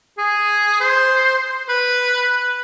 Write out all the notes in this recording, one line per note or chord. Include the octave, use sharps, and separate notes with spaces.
G#4
C5
B4